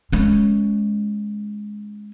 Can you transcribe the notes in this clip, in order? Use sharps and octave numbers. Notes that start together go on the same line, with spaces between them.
G#3 C#4